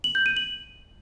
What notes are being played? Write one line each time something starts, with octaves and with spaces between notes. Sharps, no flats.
F#7
G6
D#7
F#7